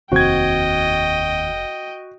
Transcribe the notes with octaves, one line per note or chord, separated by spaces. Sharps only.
F1 D#2 C4 F#4 D#5 G5 G#6